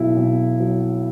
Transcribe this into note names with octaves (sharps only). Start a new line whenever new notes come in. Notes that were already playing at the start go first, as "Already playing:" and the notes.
Already playing: B1 E4
B1
F#3